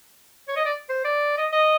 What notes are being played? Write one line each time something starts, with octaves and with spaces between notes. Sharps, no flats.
C#5
D#5
D5
C5
D5
D#5
D#5